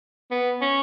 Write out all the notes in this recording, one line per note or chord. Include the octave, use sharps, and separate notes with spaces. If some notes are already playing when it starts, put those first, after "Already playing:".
B3
C#4